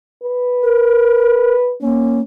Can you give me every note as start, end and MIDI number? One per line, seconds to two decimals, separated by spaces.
0.23 1.75 71
0.63 1.55 70
1.81 2.20 58
1.81 2.22 61